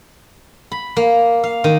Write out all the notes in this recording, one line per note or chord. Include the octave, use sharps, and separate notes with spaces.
B5
A#3
F5
D#3